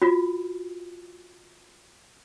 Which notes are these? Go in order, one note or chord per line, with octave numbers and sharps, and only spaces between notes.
F4 F#4